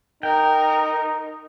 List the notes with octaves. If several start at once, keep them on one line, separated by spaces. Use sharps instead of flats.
D#4 A#4 G5